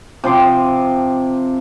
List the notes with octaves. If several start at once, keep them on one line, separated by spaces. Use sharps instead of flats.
C3 F3 C6 D6